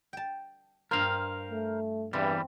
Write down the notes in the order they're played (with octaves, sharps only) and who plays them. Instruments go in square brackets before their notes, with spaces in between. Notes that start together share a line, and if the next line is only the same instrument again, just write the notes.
[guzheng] G5 A5
[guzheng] G2 F4 [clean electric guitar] A#4 C5 F5
[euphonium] A3
[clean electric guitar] E2 E3 G3 [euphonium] G2 [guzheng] C4